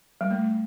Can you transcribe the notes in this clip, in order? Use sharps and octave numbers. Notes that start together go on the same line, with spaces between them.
G3
A3